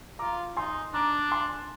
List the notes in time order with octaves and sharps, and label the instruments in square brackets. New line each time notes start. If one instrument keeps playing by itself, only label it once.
[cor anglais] F4 [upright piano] A#5 D6
[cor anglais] D#4 [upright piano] G#5 C6
[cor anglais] D4 [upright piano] A#5 D6
[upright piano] G#5 C6